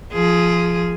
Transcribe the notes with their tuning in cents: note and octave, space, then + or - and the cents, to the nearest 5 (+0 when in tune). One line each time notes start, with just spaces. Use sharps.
F3 -10 G#4 +5